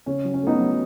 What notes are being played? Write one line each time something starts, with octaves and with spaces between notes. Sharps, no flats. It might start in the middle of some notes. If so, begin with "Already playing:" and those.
C#3 C#4
F#3
C#4
A3 B3 D#4
F#3